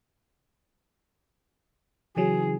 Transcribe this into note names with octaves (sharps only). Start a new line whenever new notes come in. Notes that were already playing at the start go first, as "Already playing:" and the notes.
C#3 E3 F#3 G#4